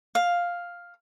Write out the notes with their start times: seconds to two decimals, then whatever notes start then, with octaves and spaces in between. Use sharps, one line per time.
0.15 F5